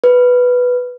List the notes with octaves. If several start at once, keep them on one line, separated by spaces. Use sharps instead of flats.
B4